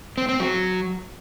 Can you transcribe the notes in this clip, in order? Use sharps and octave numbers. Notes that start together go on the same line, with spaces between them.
C4
C4
F#3